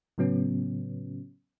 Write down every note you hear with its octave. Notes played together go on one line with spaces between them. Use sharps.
A2 C#3 F#3 B3 C#4